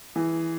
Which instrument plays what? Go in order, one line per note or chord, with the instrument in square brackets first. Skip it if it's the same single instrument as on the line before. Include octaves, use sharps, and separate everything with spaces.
[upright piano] E3 [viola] G#4